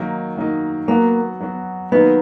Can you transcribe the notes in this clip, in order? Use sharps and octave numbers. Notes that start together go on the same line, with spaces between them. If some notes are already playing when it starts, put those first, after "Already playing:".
Already playing: D#3 F#3 A#3 D#4
D#3 F#3 A#3 D#4
F#3 A#3 B3 F#4
F#3 B3 F#4
D#3 F#3 A#3 B3 D#4